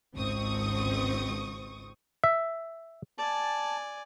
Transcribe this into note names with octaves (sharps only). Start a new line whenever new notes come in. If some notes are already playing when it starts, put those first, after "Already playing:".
G#1 C#2 C4 C#6 D#6
E5
D5 G#5 A5